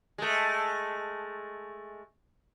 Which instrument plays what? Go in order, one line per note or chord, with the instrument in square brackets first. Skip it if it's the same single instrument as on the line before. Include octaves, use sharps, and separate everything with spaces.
[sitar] G#3 A3